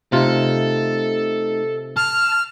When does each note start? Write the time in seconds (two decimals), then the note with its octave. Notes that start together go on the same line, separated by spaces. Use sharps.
0.12 C3 A3 D#4 F4 A4
1.97 A5 F6